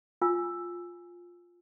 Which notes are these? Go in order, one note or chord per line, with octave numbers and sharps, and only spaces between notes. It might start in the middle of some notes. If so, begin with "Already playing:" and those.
F4 G#5 E6